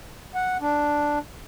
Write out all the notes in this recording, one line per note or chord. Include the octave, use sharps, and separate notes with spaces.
F#5
D4